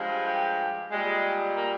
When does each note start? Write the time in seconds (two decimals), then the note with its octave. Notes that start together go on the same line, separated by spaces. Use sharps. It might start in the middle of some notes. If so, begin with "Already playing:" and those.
Already playing: G2 F3 G#3
0.26 G4
0.91 A#2 G3 G#3
1.55 A#3